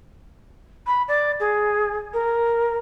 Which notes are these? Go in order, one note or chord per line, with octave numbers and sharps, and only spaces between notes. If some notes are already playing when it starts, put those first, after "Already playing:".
B5
D5
G#4
A#4